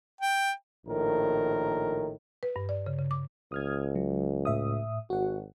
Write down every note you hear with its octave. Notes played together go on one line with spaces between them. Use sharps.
G5
A#1 A2 D#3 A#4
B4
G2
D5
C#3
C#3
D6
C#2 D#6 F6 G#6
F#3
A2 E5 D#6
G#1 F#4 F#5